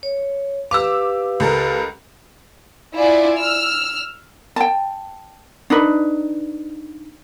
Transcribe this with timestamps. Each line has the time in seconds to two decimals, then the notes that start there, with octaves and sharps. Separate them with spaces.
0.03 C#5
0.71 G4 B4 F5 D6 E6
1.40 C#2 A4 A#4
2.95 E4 F4 D5 G#5
3.37 E6 F6
4.56 G5 A5
5.70 D4 D#4 B4